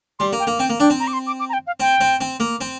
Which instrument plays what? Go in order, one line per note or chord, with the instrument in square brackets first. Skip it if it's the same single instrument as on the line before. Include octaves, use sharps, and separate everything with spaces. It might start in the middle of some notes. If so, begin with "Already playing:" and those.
[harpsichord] G3 [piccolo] C6
[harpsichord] A#3
[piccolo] G5
[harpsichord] A#3
[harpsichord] C4 [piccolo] G5
[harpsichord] A#3
[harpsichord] D4 [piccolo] G5
[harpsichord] C4
[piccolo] A#5
D6
C6
D6
D6
A#5
G5
F5
[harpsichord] C4 [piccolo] G5
[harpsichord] C4
C4
A#3
C4